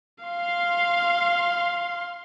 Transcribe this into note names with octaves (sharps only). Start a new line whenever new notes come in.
F5 C6